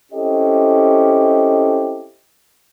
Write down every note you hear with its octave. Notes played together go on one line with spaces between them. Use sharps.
C4 C#4 E4 G4 A4 D#5